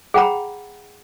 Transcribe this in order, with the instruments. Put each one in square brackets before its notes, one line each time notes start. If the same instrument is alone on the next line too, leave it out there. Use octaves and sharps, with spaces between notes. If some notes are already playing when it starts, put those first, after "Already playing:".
[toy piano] G#4 F#5 G5 A#5 B5